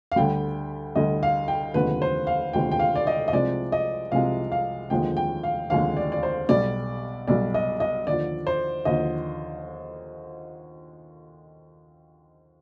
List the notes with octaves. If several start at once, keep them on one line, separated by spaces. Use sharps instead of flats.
F5
D2 D3 G3 G5
D2 D3 G3 D#5
F5
G5
F1 D#2 D3 F3 G#3 B4
C5
F5
F1 D#2 D3 F3 G#3 G5
G5
F5
D5
D#5
D#5
C2 C3 F3 G#3 D5
D#5
C2 C3 F3 G#3 F5
F5
F1 D#2 D3 F3 G#3 G5
G5
F5
F1 D#2 D3 F3 G#3 F5
D5
D5
C5
B1 B2 G3 D5
B1 B2 G3 D5
D#5
D#5
D#2 D3 F3 D5
C5
D#2 D3 F3 D#5